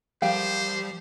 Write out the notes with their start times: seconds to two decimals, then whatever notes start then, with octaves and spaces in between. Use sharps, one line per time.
0.22 F3 G3 G4 A#4 C5 F5 G5